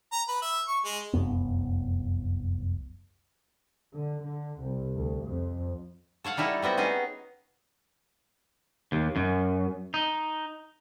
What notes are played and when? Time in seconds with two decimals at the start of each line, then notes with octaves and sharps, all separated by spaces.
0.12 A#5
0.28 B4
0.42 E5
0.68 C#6
0.84 G#3
1.13 F1 C2 F#2 B3
3.92 D3
4.22 D3
4.60 C2
4.95 D2
5.27 F2
6.24 A4 C#5 F5 F#5
6.37 G3 D#4 E4 A4 C#5
6.62 G3 B3 C4 F#4
6.77 B3 C#4 D#4 G#4
8.92 D#2
9.16 F#2
9.94 D#4